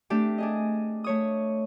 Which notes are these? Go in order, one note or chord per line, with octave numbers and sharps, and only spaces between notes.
A3 C4 D4 G4
D4 G#4 D#5
A3 C#5 D#6